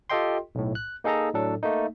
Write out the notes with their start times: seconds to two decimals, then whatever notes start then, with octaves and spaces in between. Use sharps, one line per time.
0.10 F4 G4 A4 D#5 G5 C6
0.55 B1 A2
0.75 F#6
1.04 A#3 D#4 G#4 A4 D#5 A#5
1.34 A2 F#3 D4 A4
1.63 A3 A#3 D#4